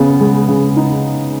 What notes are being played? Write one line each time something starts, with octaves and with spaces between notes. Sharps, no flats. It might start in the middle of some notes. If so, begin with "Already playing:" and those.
Already playing: C#3 B3
G#3
C#3
D#4